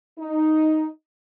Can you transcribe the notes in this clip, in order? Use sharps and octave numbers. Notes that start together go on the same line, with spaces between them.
D#4